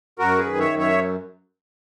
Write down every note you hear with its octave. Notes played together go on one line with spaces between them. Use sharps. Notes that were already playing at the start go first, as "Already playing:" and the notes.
F#2 F#4 A#4
G#4 B4
D#3
C#5 E5
F#2
C#5 E5